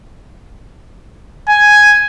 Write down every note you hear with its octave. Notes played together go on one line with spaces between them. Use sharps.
G#5